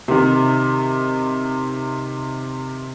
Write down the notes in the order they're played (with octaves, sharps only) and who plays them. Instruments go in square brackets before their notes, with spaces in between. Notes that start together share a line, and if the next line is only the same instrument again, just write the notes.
[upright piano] C3 D#3